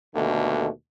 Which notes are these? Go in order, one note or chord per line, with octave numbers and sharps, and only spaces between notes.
D#2 B2 D3 A3